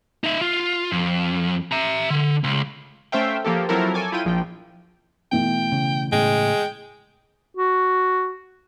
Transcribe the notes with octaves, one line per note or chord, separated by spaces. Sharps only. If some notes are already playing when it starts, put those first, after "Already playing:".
D#4 E5
F4
F2
E5 A#5
D3
C#2
A3 C#4 C5 E5 F5 G5
F3 A#3 G4 A4
F3 F#3 C4 E4 A4 A#4
A4 C#5 G#5 D6
E4 F4 G5 D#7
A#1 F3 G5
B2 E3 A3 G5
C#3
A2 C#3 G#3 G5
F#4